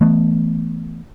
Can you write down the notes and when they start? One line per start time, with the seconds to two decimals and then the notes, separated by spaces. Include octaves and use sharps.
0.01 E3 A3 B3